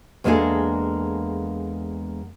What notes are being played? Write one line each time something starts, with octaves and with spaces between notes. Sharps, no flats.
E2 G#3 A#3 D4 G#4 A4